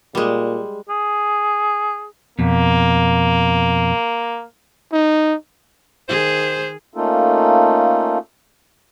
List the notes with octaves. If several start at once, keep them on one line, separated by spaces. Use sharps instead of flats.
A#2 G3 G#3
G#4
F2 B2 A#3
D#4
D#3 G#4 C5
A3 A#3 C#4 D#4 F4 A4